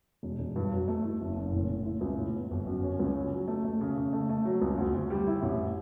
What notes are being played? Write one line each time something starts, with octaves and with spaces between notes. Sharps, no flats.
E1
E1
G2
F#3
A3
E4
F#1
F#1
A2
A2
E4
C#2
A2
B3
G1
F#2
C#4
C#2
C#4
F#3
A3
A3
C#3
C#3
A3
A3
F#3
C#2
D2
D2
G3
E4
A1